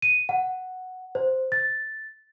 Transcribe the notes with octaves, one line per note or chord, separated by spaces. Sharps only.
D#7
F#5
C5
A6